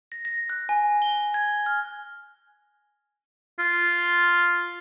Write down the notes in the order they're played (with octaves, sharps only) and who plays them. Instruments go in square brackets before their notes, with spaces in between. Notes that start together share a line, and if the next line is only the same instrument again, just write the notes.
[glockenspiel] A#6
A#6
F#6
G#5
G7
G#6
F6
[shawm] F4